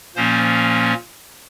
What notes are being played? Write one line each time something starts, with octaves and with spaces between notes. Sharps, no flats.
A#2 F3 A#3 C#4 C5